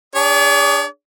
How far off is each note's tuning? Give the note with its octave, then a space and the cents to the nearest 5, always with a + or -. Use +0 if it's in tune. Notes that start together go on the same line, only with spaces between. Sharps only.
D4 +0 G#4 -35 C#5 +45